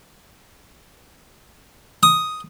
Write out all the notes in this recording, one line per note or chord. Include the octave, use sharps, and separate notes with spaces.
D#6